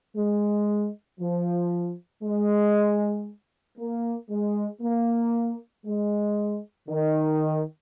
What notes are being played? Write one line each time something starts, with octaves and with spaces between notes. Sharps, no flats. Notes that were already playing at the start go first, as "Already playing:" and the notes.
G#3
F3
G#3
A#3
G#3
A#3
G#3
D#3